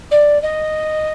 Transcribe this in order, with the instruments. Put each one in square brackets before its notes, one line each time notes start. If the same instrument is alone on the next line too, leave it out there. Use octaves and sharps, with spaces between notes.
[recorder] D5
D#5